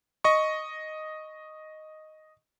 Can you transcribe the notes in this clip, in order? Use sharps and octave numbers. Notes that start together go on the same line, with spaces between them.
D#5 C#6